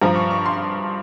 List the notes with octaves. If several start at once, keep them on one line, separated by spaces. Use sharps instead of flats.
G2 F3 A#5
C#6
C#6
C6